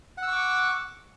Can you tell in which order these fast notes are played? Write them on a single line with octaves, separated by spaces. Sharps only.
F#5 E6 C#6 D6